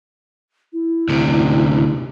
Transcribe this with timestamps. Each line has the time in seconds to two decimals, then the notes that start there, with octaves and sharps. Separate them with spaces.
0.73 E4
1.09 D2 C3